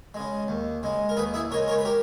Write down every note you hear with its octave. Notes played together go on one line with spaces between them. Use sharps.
C#3 G#3
D#2
C#3 G#3
A#4
D#2 G#4 B4
E4 G#4
C#3 G#3 A#4 C#5
A#4 C#5
B4
G4 A#4